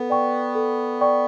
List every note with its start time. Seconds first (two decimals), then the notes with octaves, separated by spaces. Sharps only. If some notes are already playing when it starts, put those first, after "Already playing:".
Already playing: B3 A4
0.10 D5 G5 C#6
0.55 A4
1.01 D5 G5 C#6